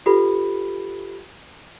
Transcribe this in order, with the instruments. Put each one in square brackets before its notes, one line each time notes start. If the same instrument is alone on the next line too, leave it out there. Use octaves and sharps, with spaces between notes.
[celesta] F4 G4 A4 B4 B5